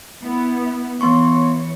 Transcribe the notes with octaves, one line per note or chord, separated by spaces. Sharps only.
B3 E4
E3 B3 C#5 C6 C#6